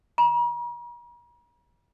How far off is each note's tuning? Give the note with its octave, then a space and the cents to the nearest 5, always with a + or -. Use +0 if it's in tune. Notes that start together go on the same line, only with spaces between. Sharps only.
A#5 +45